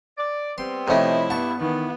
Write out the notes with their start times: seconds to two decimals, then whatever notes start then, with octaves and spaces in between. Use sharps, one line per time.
0.18 D5
0.58 G3 B3 C4 C6
0.88 C3 F3 A3 E4 C#5 D#5
1.30 G2 B3 A5 C#6
1.61 D#3 E3 B3